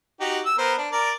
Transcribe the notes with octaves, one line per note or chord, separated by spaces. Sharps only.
D#4 F#4 G4
E6
B3 A#4 C5
D4
A#4 D5